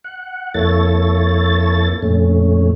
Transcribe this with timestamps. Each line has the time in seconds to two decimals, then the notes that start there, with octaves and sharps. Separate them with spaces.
0.04 F#5
0.54 F2 A#3 E4 A4 C#5 A6
2.03 F2 A#2 A3 C#4